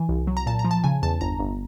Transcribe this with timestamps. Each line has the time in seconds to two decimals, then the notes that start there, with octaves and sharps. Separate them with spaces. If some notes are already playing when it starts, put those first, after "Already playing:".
Already playing: E3 G#5
0.09 C2
0.27 F#3
0.37 A#5
0.46 A#2 A5
0.59 A#5
0.65 F3
0.71 A5
0.84 C#3 G#5
1.02 E2 A5
1.21 G1 A#5
1.39 G1